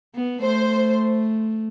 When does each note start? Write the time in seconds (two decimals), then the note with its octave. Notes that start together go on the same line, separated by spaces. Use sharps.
0.15 B3
0.42 A3 C5